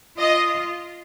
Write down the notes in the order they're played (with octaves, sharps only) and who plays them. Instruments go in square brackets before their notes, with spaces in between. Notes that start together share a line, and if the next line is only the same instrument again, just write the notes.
[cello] F4 [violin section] D#5